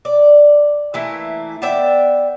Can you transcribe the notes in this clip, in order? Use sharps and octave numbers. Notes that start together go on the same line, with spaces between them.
D5
E3 A3 A#3 E4
B3 D5 E5 G5